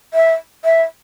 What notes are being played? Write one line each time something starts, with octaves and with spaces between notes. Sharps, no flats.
E5
E5